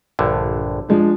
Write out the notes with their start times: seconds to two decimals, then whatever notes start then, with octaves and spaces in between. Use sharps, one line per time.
0.19 A#1 G2 D3
0.89 F3 G#3 D4